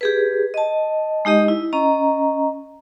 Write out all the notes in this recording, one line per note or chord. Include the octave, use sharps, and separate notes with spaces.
G4 G#4 B4
D#5 A5
G#3 D#4 G4 D#5
E4
C#4 D#5 A#5